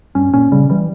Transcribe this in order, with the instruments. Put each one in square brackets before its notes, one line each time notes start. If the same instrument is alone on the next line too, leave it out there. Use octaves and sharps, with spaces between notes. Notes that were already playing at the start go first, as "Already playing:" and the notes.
[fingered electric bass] G2 [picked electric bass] C#4
[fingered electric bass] A#2 [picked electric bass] C#4
[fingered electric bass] C#3 [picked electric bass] G3
[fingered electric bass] E3 [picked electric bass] G3